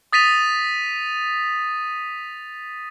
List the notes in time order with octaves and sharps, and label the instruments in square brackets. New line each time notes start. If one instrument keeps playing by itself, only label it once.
[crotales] D#6 A6 B6 D#7 F7